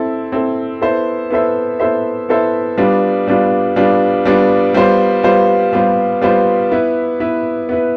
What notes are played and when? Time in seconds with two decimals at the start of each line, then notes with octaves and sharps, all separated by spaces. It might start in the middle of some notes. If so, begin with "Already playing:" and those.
Already playing: C4 E4 A4
0.32 C4 E4 A4
0.82 B3 E4 A4 C5 E5
1.30 B3 E4 A4 C5 E5
1.80 B3 E4 A4 C5 E5
2.29 B3 E4 A4 C5 E5
2.78 G3 B3 D4 F4
3.27 G3 B3 D4 F4
3.76 G3 B3 D4 F4
4.25 G3 B3 D4 F4
4.74 G3 B3 F4 C5
5.23 G3 B3 F4 C5
5.73 G3 B3 F4 C5
6.21 G3 B3 F4 C5
6.72 B3 E4 B4
7.20 B3 E4 B4
7.69 B3 E4 B4